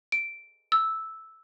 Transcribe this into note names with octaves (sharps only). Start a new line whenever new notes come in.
D7
E6